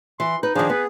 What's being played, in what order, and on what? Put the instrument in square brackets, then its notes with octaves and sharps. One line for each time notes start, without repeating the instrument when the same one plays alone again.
[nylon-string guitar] E3 [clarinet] C6
[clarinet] D#4 [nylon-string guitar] B4
[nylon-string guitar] D#3 F3 [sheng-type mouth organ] D4 G#4
[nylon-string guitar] B3 [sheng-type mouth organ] G#4 [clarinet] B4